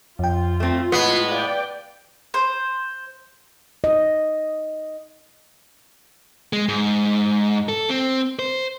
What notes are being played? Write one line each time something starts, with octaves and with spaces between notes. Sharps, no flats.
F2 F4 G5
A3 C4
A2 G#3 B3 F#6 B6 C7
D5 F5 G5
C5
D#5
G#3
G#2
A4
C4
C5